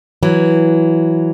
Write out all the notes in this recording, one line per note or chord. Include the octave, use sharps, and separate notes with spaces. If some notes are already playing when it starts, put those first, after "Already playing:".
E3 F#3